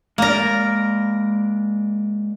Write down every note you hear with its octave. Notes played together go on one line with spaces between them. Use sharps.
G#3 A#3 A#4 D5